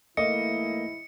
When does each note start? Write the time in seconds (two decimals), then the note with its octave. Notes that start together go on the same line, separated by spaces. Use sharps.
0.17 G#2 E3 A3 A#3 E4 D#5 C#7